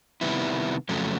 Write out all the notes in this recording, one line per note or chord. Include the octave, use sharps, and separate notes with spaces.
C3 D#3 G3 B3 E4
F2 C#3 F#3 A3